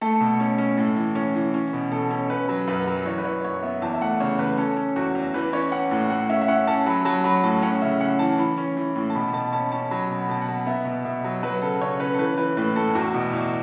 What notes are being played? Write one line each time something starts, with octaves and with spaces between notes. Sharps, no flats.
A3 A4
B2
C#4
C#4
A2
E3
C#4
E3
C#4
B2
B2 A4
C#4
C#4 B4
F#3
F#2 B4
F#3
E3 C#5
B4
E3 C#5
F#2 C#5
B3 E5
E2 A5
E5
A3 F#5
C#3 C#5
E2 B4
C#4 A4
C#4
E2 F#4
E2
E3 B4
C#4 C#5
C#4 F#5
A2 F#5
A2 F#5
C#4 E5
E5
C#4 F#5
C#4 A5
F#3 B5
F#3 A5
F#3 B5
A2 A5
C#4 F#5
C#3 E5
C#4 F#5
E3 A5
E3 B5
C#4
E3
A2
A5
B2 B5
B2 A5
C#4 A5
C#4 A5
F#3 B5
B2
B5
B2 A5
F#5
B2
B3 E5
B2
B2 E5
F#3
F#3 B4
C#3 A4
C#3 C#5
C#4 B4
A4
E3 B4
E3 B4
A2 B4
A2 A4
E2 F#4
B2
E2